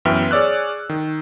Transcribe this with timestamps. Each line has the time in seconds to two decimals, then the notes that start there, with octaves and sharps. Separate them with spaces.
0.05 F#2 E3 B3 E5 G5 F6
0.31 G#4 C#5 D5 E6 F#6
0.89 D#3